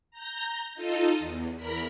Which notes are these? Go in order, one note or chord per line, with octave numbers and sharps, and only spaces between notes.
A#5 G6 A#6
D#4 F4 A4 D#5
E2
E2 A#4 B5